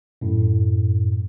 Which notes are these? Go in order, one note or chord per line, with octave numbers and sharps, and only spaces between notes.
F#2 A2